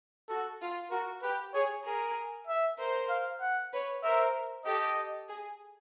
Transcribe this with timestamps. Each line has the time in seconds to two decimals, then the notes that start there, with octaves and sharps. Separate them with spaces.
0.29 F#4 A4
0.61 F4
0.91 F#4 A#4
1.23 G4 B4
1.54 G#4 C#5
1.85 G#4 A#4
2.47 E5
2.79 A#4 C5
3.10 F5
3.41 F#5
3.73 B4 C#5
4.03 A#4 C5 E5
4.66 G4 A4 D#5
5.29 G#4